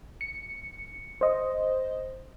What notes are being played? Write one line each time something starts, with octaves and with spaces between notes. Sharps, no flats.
C#7
C5 D#5